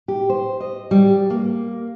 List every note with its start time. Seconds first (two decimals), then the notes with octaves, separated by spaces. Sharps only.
0.08 G4
0.29 C5
0.60 D#5
0.91 G3
1.30 A#3